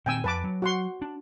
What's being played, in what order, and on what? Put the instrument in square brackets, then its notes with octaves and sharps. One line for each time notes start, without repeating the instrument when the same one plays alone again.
[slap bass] A#2 D#3 C4 [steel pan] G5 G#5 E6
[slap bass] F2 [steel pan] B4 A5 D6
[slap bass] F#3
[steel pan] F#4 F#5 C6
[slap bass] D4